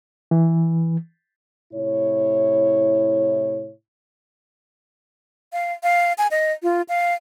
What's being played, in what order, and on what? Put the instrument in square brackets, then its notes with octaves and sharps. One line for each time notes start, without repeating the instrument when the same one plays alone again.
[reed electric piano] E3
[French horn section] A2 C3 E4 C#5
[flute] F5
F5
G#5
D#5
F4
F5